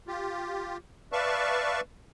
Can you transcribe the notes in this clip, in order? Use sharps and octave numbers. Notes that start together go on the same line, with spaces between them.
F4 G4
B4 D5 E5 F5 A5 C#6